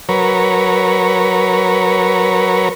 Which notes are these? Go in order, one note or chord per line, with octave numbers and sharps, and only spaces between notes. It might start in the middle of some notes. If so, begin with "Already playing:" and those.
F#3 A#4 B4 C#5